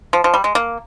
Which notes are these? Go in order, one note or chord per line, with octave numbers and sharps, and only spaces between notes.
F3
F3
G3
G#3
A#3